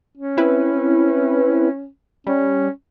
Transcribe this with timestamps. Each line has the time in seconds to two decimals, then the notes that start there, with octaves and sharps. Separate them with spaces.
0.17 C#4
0.37 C4 E4 B4
2.27 G3 C#4